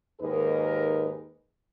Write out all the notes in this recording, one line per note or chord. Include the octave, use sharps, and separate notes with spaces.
D#2 G#2 D#4 G#4 A#4 B4